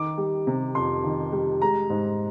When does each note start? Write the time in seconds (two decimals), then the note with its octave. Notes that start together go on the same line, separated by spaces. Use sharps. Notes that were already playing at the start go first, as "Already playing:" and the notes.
Already playing: D#3 D6
0.18 G3
0.47 C3
0.75 F2 C6
1.04 D#3
1.32 G3
1.61 G#3 A#5
1.90 G#2